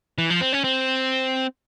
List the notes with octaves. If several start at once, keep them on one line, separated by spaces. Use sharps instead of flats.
E3
F3
C4
C#4
C4